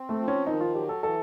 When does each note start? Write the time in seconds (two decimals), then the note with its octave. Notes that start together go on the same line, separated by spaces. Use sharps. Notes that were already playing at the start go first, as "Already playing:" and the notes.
Already playing: C4
0.09 A3
0.19 F3
0.28 C#4
0.46 D#3 D#4
0.60 F4
0.75 F#3 G4
0.89 A4
1.03 E3 A4